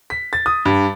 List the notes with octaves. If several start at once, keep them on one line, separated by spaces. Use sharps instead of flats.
B6
A6
D#6
G2